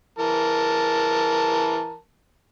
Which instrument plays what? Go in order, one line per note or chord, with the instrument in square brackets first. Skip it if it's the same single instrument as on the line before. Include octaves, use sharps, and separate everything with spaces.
[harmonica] E3 A#4 A5